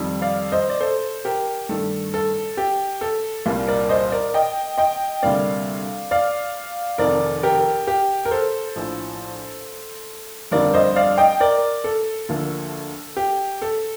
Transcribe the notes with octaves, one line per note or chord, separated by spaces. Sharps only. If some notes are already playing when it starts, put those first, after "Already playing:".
Already playing: F2 D#3 G3
D5 F5
C5 D#5
D5
A4 C5
G4 A#4
G2 D#3 A3 A4
A4
G4
A4
C2 A#2 G3 A#3
A#4 D5
C5 D#5
A#4 D5
D#5 G5
D#5 G5
D2 C3 G3 A#3 D5 F5
D5 F5
F1 F2 D#3 A#4 D5
G4 A#4
G4
A#4
A4 C5
A#1 A2 F3
G1 F2 D3 G3 A#4 D5
C5 D#5
D5 F5
D#5 G5
A#4 D5
A4
D2 D3 F3 A#3
G4
A4